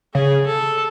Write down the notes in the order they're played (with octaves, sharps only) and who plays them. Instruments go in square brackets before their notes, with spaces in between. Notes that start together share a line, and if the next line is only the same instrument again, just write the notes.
[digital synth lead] C#3 [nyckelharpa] G#4
[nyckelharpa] A4